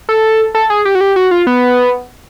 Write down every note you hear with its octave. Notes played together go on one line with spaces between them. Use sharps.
A4
A4
G#4
G4
F#4
G4
F#4
F4
B3